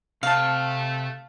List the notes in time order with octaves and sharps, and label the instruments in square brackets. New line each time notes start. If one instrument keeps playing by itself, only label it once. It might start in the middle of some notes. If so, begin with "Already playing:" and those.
[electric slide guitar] C3 C5 [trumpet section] A3 [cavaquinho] F5 A5